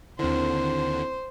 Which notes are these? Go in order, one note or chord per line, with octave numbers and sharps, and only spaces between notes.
D#2 D3 C4 E4 C5